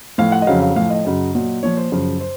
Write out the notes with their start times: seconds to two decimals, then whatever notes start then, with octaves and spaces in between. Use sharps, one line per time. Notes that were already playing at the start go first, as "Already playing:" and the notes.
0.18 A2 F3 F5
0.32 F#5
0.42 D#5
0.47 F2 C#3 F#3 F5
0.62 F5
0.76 A2 F3 F5
0.90 D#5
1.05 F#2 C#3 F#3
1.35 A#2 F#3
1.63 A#2 F3 C#5
1.77 C5
1.92 F#2 C#3 F3
2.21 C5